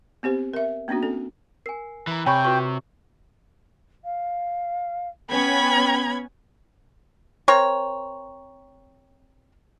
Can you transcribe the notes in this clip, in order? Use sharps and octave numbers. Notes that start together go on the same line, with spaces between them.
B3 C4 G4 C5
A#4 E5
A#3 B3 C#4 D4 F#4
C4 A4
A#4 G#5 C7
E3 A#5 B5
C3 G4 C#5 G5 G#5 B5 C#6
F4 F#4 B4 C#6
F5
B3 C#4 G5 B5 G#6
C4 A#4 C#5